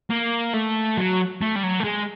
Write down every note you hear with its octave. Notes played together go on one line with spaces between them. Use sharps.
A#3
A3
F#3
A3
G3
F#3
A3
G#3